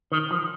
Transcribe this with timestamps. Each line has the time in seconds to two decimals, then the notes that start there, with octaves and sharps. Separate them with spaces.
0.12 D#3
0.31 F3